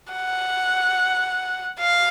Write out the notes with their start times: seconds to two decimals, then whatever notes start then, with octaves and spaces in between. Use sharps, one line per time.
0.13 F#5
1.80 F5